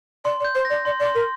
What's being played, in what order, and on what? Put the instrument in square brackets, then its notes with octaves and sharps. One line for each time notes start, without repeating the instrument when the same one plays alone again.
[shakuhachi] D5 [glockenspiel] C6
[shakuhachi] D5
[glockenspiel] G6
[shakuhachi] C5
[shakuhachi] D5 [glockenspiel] A#6
[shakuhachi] D5 [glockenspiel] C6
[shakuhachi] D5
[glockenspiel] C6
[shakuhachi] A#4